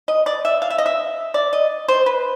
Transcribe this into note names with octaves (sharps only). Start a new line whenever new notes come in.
D#5
D5
E5
F5
E5
D#5
E5
D5
D#5
C5
B4